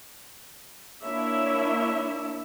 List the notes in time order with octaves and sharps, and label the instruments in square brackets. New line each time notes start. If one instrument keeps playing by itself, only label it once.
[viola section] A#3 D4 E4 C#5 E5